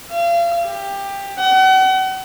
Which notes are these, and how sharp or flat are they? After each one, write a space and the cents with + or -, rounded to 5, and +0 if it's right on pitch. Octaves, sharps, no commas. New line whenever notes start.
F5 -35
G4 +15
F#5 +40